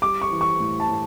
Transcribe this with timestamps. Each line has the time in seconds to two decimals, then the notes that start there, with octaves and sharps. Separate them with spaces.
0.02 G3 D6
0.22 C#6
0.31 E3
0.41 C#6
0.60 A2
0.80 A5
0.89 A2